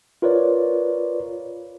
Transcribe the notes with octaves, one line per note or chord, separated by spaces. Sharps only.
F4 A#4 B4 C#5 D5